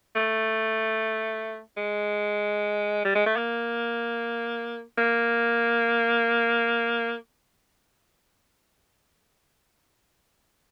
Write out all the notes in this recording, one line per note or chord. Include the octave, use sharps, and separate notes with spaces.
A3
G#3
G3
G#3
A3
A#3
A#3